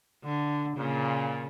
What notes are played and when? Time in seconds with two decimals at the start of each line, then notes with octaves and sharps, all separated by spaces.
0.24 D3
0.77 A#2 C#3